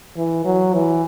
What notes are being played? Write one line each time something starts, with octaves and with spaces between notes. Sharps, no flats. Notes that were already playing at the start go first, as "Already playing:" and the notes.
E3
F#3
E3